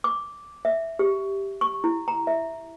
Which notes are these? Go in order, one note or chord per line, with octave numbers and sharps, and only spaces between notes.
D6
E5
G4
C#6
E4
A#5
E5